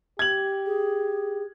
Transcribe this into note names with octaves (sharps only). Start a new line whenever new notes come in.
G4 G#6 F#7
G#4